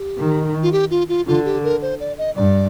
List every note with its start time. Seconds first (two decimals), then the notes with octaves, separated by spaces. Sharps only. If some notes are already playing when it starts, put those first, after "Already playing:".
Already playing: G4
0.18 D#3
0.63 F4
0.72 G4
0.91 F4
1.09 F4
1.27 D3 F4
1.45 G4
1.64 A#4
1.82 C5
2.00 D5
2.18 D#5
2.36 G2 D5